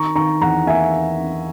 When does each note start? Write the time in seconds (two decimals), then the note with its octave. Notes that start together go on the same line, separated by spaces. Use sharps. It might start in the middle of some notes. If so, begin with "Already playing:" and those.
Already playing: D#3 A#5 C#6
0.15 D#3 A#5 C#6
0.41 E2 F#5 A#5
0.67 A#3 E5 G#5